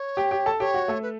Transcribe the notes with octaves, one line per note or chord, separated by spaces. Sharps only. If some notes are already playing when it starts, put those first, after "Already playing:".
Already playing: C#5
G4 G5
G4 G5
A4 A5
G4 C#5 G5
F#4 F#5
A3 A4
B4